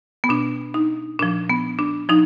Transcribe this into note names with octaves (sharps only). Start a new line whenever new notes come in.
B3
B2 D4
D#4
A#2 F3 D4
B3
D4
F3 D#4